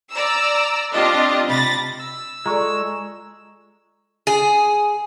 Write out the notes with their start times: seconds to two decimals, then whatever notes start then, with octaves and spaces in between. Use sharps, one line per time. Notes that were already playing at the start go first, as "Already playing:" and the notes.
0.11 D5 A#5 E6
0.92 C4 D4 F4 G4 D#5
1.47 C3 B5 A6 A#6
1.99 E6
2.46 G#3 F4 G#4 A4 D5 A#5 C#6
4.27 G#4